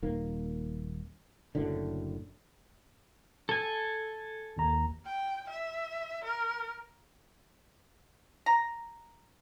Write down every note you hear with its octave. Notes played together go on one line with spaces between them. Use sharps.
D#1 D#3 A#3
F#1 F#2 A2 D3
A4 G#5
G#1 D#2 A#5
G5
E5
A#4
A#5